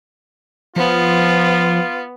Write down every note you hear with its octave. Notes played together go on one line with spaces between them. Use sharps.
F3 B3 F4